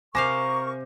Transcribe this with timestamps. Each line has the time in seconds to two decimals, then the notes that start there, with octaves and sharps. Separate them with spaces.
0.15 C3 A#4 C5 F5 G#5 C#6 D6 A#6